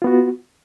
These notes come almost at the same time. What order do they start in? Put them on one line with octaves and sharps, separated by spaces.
F4 B3 F#4